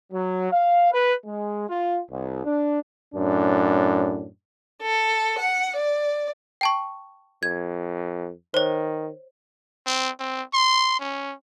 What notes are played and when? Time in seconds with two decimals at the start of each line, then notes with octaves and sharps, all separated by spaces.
0.12 F#3
0.52 F5
0.92 B4
1.26 G#3
1.69 F4
2.10 C2
2.45 D4
3.15 F#2 A2 D4
4.82 A4
5.39 F#5
5.77 D5
6.61 G5 A5 C#6
7.43 F2 G#6
8.54 D#3 C5 C#5
9.87 C4
10.19 C4
10.54 C6
11.00 C#4